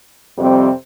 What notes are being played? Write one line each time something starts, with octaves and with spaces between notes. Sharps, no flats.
F2 C3 G3 C4